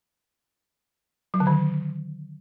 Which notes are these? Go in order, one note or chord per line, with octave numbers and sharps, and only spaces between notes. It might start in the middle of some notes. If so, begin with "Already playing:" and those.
F#3
D3
D#3